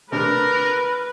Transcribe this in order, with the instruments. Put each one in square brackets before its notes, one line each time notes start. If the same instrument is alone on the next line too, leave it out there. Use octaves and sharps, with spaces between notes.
[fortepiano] C3 A3 D4 [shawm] A#4 [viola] B4